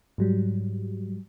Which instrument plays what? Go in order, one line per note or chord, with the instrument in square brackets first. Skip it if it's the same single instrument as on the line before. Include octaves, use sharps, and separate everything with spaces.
[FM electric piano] G#2 F#3 G3